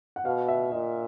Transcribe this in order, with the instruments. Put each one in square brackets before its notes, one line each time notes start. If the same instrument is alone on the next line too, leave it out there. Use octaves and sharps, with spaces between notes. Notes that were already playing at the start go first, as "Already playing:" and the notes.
[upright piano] F#5
[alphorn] B2 [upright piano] F5
[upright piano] E5
[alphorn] A#2 [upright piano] D#5